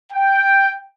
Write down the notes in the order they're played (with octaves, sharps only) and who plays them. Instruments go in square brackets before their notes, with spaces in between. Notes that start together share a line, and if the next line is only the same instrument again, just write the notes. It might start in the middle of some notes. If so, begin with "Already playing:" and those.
[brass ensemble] G5